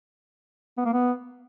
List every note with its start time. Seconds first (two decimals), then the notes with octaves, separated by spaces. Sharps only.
0.78 B3
0.85 A#3
0.93 B3